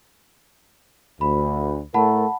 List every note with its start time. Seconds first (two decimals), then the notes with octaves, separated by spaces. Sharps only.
1.21 D2 B5
1.94 A2 A3 A#4 F#5 A5 B5